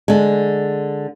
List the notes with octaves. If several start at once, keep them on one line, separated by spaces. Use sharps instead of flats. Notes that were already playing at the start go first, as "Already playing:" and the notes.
D3 G#3